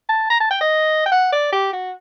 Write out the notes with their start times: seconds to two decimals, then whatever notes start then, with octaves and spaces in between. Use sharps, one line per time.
0.09 A5
0.30 A#5
0.40 A5
0.51 G5
0.61 D#5
1.06 G5
1.12 F#5
1.32 D5
1.52 G4
1.73 F#4